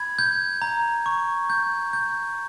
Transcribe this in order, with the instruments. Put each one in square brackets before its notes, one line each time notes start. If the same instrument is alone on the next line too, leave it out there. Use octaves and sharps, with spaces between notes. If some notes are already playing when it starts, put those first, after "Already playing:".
Already playing: [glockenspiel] B5 G#6
G6
A#5
C#6
G6
G6